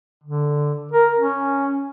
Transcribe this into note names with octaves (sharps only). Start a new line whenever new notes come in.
D3
A#4
C#4